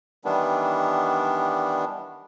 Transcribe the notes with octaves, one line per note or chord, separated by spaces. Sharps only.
D#3 E3 G3 B3 D4